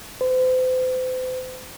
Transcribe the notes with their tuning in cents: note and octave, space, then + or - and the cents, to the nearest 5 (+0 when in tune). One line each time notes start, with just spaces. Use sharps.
C5 -40